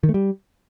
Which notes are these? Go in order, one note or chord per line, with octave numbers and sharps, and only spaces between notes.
D#3
A3
G3